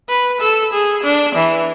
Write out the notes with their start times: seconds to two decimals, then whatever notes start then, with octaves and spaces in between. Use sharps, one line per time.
0.09 B4
0.41 A4
0.73 G#4
1.04 D4
1.36 E3